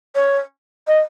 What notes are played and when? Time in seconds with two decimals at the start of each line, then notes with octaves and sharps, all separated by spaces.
0.15 C#5
0.87 D#5